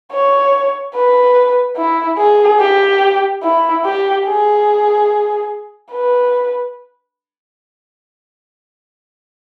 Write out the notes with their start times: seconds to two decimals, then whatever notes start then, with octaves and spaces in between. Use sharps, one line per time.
0.12 C#5
0.94 B4
1.77 E4
2.18 G#4
2.60 G4
3.43 E4
3.85 G4
4.26 G#4
5.92 B4